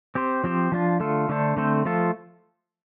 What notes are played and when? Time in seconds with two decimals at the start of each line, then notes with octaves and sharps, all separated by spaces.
0.15 C4 G4 C5
0.44 F3 C4 G4 C5
0.72 F3 D4 F4
1.00 D3 A3 F4 A4
1.29 D3 A3 D4 A4 C5
1.56 D3 A3 C4 A4 C5
1.85 F3 A3 F4 A4